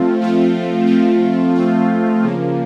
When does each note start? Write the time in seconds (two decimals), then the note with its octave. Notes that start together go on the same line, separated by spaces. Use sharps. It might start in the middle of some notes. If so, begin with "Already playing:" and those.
Already playing: F3 A3 C4 F4
0.20 F3 A3 C4 F4
0.87 F3 A3 C4 F4
1.56 F3 A3 C4 F4
2.24 C#3 F3 A#3